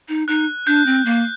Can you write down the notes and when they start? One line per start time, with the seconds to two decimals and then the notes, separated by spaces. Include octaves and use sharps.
0.09 D#4
0.28 D#4 F#6
0.67 D4 G6
0.86 C4
1.05 A#3